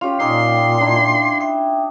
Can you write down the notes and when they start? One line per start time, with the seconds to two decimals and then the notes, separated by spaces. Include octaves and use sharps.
0.01 C#4 F4 G4 C#5 G5
0.20 A#2 C#4 D#4 F5 G5 C6 D6
0.81 D4 E4
1.40 E5 G5 D#6